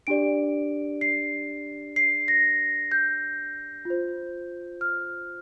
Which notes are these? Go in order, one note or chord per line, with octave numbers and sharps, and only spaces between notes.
D4 G4 D5 D7
C7
C7
A#6
G6
F4 C5
F6